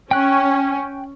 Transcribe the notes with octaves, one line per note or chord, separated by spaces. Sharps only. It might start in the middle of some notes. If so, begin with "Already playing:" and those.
C#4 G5 F#6